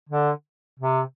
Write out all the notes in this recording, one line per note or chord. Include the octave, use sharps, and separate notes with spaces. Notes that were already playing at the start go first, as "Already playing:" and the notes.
D3
C3